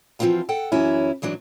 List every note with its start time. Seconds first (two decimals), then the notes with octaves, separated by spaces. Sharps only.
0.19 E3 F3 A3 C4 F4 F#4
0.49 A4 F#5 G5
0.72 F#2 E3 F#3 C#4 E4
1.22 G#2 E3 F#3 D4